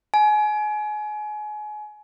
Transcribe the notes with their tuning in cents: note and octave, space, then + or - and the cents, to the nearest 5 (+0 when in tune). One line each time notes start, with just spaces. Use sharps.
G#5 +30